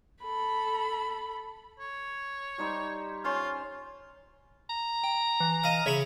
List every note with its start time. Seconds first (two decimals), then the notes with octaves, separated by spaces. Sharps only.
0.23 A4 B5
1.79 C#5
2.58 G3 D#4 C5
3.24 C#4 F4 C5
4.70 A#5
5.04 G5
5.40 E3
5.64 D#5 F5
5.86 C#3 C#5 E5 B5 C#6